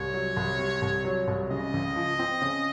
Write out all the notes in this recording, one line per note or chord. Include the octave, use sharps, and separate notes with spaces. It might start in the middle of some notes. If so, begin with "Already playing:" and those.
Already playing: C2 C#5
F#3
C2
C3
C2
F#3
C2
C#3 D#5
C#2
F3
C4
C#3